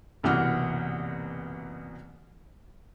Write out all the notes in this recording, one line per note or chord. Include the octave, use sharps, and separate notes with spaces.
F#1 C2 B2 E3 F#5 F6